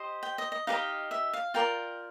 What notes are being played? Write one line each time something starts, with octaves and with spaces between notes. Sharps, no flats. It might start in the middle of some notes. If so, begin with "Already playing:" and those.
Already playing: G4 C5 D#5
G5
D#5
D#5
D#4 G4 B4 D#5 F5
E5
F5
F4 A#4 D5 G5